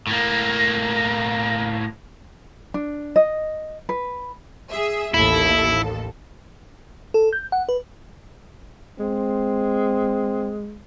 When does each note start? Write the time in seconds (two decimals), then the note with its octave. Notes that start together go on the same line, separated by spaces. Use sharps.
0.07 A2 A#3
2.74 D4
3.16 D#5
3.89 B4
4.70 G#4 E5
5.14 A1 D#2 E4 A4
7.14 A4
7.33 G6
7.52 F#5
7.69 B4
9.00 G#3 C4